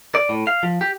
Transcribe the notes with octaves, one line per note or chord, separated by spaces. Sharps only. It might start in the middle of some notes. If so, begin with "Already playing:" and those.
D5
A2
F5
F3
G4